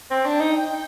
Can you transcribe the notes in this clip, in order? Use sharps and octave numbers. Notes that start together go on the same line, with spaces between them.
C4 G5
D4
D#4